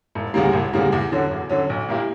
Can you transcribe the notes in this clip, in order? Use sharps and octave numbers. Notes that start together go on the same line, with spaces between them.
E1
D2 C#3 G3 A#3
E1
D2 C#3 G3 A#3
E2
D3 F#3 C#4
E2
D3 F#3 C#4
B1
A#2 A#3 E4 G4